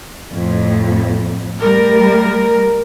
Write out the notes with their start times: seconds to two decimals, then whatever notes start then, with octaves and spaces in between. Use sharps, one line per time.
0.32 F2 A2
1.61 G3 A3 A#4